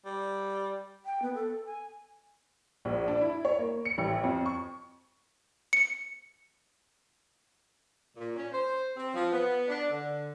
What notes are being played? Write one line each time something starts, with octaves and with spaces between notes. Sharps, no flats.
G3
G5
B3
A4
G#5
A#1
D4
E4
C#5
A#3
C#7
A1
F2
C#6
C#7
A#2
C#4
C5
C4
F3
B3
D4
D3